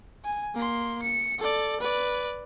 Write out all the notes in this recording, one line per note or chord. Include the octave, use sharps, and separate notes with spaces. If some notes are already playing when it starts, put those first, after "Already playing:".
G#5
A#3 C6
C#7
A4 D5
B4 D5